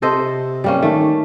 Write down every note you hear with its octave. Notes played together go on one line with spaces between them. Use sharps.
C3 A4 C5 D#5
G3 A#3 C#4
D#3 A3